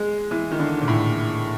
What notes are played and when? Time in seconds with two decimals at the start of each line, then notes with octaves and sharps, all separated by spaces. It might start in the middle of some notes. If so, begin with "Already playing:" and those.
Already playing: G#3
0.31 E3
0.51 D#3
0.59 D3
0.81 A#2
0.88 A2